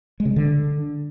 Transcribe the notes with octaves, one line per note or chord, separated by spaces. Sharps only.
G#3
C#3
G#3
D3